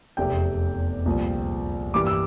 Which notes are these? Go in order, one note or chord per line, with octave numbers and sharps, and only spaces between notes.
F1 E2 C3 G5
C2 A#2 F3
G2 E3 G3 A#3 D6
E6